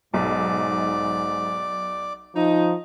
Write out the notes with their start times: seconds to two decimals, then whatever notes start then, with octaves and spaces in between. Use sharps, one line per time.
0.14 B1 G#2 D5 D6
2.35 F3 D#4